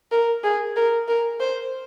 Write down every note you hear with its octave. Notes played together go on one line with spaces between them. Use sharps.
A#4
G#4
A#4
A#4
C5